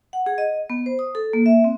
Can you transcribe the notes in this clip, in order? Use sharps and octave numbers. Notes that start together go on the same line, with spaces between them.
F#5
G#4
D#5
B3
C5
D#6
A4
A#3
E5
C4